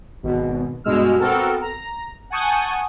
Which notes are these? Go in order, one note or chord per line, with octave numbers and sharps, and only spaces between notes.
G#1 B2
G2 B2 G#3 E6 F6
B3 C4 F#4 A4 A#4
A#5
F#5 G#5 A5 C#6 D#6 G6